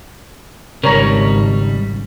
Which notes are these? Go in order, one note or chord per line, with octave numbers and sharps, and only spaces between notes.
G#1 C#3 G3 A#4 C#5 A#5